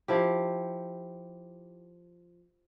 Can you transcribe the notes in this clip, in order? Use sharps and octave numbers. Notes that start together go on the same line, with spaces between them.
F3 E4 G4